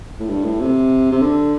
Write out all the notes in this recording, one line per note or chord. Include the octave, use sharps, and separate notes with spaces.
A2
G2
A2
C3
C3
D3